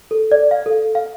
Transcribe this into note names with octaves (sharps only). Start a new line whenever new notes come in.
A4
D5
F5
A4
F5